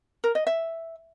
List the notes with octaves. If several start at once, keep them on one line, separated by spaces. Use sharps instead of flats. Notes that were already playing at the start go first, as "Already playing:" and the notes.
A#4
D#5
E5